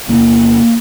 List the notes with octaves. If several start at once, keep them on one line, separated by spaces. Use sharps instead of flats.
E2 C3 A#3